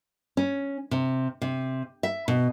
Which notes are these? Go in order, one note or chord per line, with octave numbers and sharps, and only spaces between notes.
C#4
C3
C3
E5
B2